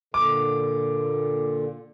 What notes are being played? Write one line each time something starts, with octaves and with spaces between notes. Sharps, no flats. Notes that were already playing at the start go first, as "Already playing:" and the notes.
A#2 D3 D6